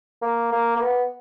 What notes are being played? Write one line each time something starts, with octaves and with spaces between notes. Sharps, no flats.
A#3
A#3
A#3
B3